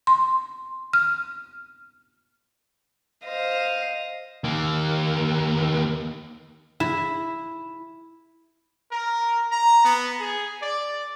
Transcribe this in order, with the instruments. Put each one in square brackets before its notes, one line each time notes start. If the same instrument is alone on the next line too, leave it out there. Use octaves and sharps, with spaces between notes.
[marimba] C6
F6
[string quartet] C5 D#5 F5
[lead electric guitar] D#2 A#3
[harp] E4
[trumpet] A#4
A#5
B3
G#4
D5